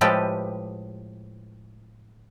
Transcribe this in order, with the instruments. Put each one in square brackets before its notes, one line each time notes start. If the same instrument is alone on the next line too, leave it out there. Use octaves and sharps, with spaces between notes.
[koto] A2 F3 G#3 G4 A4 B4